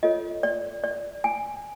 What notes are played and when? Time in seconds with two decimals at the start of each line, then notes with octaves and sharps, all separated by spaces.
0.03 F4 A4 C#5 D#5
0.43 D5
0.84 D5
1.24 G#5